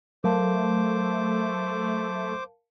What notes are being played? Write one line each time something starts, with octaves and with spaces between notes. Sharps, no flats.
F#3 A3 A#4 C5 F5 A5 D6